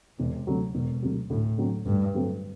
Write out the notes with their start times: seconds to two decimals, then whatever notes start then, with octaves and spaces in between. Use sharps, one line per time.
0.18 E1 C3
0.47 D2 C3 F#3
0.74 E1 B2
1.03 D2 C3 F#3
1.30 D2 A2
1.58 D3 F#3 A3 C4
1.86 D2 G2
2.14 D3 F#3 A3 C4